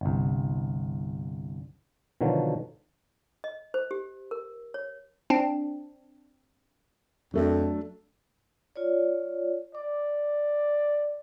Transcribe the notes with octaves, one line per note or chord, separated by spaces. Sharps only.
G1 C2
B2 D3 D#3 F3 F#3
D#5
C5
G4
A#4
C#5
C4 D4
F2 F#3 A3 D4
F4 C#5 D5
D5 D6